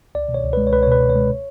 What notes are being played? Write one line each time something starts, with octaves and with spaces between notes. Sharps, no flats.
C#2 D5
B2
C#5
C#2
G#3 B4
C#5
C#2 B4
C#5
B2 B4
C#2
C#5
G#3